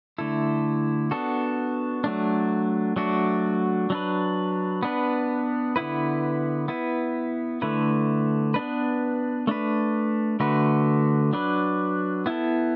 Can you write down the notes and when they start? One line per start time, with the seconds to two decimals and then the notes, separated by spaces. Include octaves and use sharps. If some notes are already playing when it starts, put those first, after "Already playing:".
0.18 D3 A3 E4 A4
1.11 B3 D4 F#4 A4
2.04 F#3 A3 D4
2.96 F#3 A3 D4 F#4
3.90 F#3 D4 B4
4.83 B3 D4 B4
5.76 D3 B3 E4 B4
6.68 B3 E4 B4
7.62 D3 A3 E4 B4
8.54 B3 D4 B4
9.47 A3 D4 B4
10.40 D3 A3 F#4 B4
11.33 F#3 D4 B4
12.26 B3 E4 A4